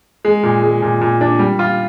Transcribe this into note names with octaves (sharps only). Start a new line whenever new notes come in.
G#3
A#2
G#3
A#2
A#2
D4
G3
F4